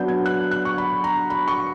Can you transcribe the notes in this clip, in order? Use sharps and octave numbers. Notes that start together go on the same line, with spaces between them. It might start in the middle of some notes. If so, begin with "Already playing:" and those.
Already playing: F#3 B3 D4 G6
G#6
F#6
F#6
C#6
B5
A#5
B5
C#6